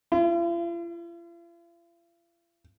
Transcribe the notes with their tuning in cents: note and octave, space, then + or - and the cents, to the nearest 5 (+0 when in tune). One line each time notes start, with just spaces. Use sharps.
F4 -45